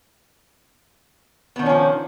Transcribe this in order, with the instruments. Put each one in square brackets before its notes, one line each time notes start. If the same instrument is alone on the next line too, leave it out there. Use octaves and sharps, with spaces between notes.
[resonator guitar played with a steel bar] B3
D#3
D4
C#4
F3